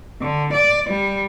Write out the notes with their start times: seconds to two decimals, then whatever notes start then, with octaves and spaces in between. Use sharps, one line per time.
0.21 D3
0.53 D5
0.89 G3